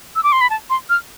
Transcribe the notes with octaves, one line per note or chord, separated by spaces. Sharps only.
E6
D6
C6
B5
A5
C6
F6